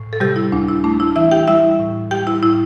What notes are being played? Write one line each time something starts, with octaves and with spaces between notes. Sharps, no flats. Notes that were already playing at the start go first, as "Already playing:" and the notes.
Already playing: A2
A4
C3 G3 G4
E4
D2 D4
E4
A3 D4
E4
E3 E4 E5
G4 G5
G3 E4 E5
A2
G3 G4 G5
E4
A2 E4